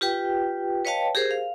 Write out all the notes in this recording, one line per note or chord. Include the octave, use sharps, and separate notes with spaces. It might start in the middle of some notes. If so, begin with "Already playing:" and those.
F4 G4 B4 G5
B4 C#5 D#5 F5 G5 A5
G4 G#4 A#4 C5
F5